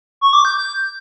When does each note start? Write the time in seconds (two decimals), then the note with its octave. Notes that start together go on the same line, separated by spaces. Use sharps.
0.21 C#6
0.33 D6
0.45 G6
0.57 G6